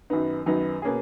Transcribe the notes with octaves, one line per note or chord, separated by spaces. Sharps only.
F#2 D#3 F#3 B3 D#4
F#2 D#3 F#3 B3 D#4
B2 A#3 C#4 G#4